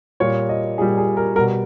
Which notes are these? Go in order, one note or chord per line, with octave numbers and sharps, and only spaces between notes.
A#2 G3 C#5
D#5
A#2 G3 G#4
G#4
A#4
B2 G3 A#4